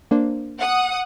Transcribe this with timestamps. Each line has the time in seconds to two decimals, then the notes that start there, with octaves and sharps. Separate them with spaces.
0.11 A#3 D4 C5
0.59 F#5 D#6